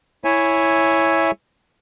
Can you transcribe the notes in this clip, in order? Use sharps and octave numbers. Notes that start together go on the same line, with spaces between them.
E4 C#5 E5 G#5